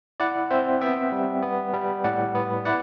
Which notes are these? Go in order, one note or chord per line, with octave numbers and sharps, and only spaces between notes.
E4 D5 F#5
C4 C5 E5
B3 E5 G5
G3
B3
G3
A2 D5 F#5
B3
E4 D5 F#5